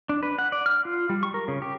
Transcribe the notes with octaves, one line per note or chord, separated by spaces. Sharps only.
D4
B4
F#5
D5
F6
F4
G3
C#6
A#4
C#3
G4